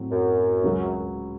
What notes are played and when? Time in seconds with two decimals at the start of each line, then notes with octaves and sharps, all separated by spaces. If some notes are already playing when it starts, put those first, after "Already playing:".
Already playing: A2 F#3 A3 C4
0.11 F#2
0.64 C#2 C#3 F#3